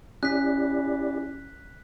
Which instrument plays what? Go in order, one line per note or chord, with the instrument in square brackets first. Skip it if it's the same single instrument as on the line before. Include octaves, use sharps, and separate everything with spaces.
[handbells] C#4 [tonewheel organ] E4 G4 D5 [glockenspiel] F#6 B6